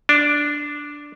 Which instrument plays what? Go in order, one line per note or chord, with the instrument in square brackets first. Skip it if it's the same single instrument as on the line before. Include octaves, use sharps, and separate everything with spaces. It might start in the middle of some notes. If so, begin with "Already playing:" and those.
[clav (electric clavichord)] D4